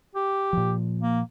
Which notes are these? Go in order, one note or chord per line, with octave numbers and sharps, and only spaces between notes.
G4
A#2 F3
A#3